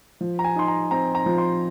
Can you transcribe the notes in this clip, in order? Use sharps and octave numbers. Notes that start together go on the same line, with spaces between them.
F3
A#5
G#5
D#4 C6
A#5
C4 A#5
A#5
F3
C6